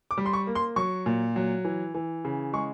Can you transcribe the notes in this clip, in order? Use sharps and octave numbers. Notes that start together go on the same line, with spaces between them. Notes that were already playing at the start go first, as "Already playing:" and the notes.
D6
G3
C6
C#6
A#3
C6
F#3 C#6
A#2
F#3
E3
E3
C#3
G#3 C#6